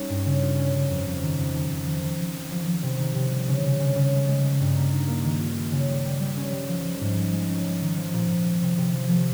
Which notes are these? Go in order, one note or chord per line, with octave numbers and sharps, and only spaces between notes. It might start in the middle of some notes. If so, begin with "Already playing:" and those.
Already playing: G3 C#4 D#4
G2
C#3
F4
C#4
C#3
F2
F2
D#3
F2
D#3
F2
D#3
D#3
F3
C4
F3
F3
C3
D#3
C3
G3
C#3
C#3
C#3
C#3
G#3
G#3
G#3
G2
A#3
D#4
A#3
D#3
F4
F4
C#3
G3
G3
G3
C#4
G3
F3
F3
G#2
G#3
G#3
C#4
G#3
D#3
F3
A#2
A#2
G#3
C3
C3
F3
F3